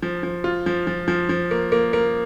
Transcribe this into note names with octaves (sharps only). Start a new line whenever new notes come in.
F3
F3
F4
F3
F3
F3
F3
A#3
A#3
A#3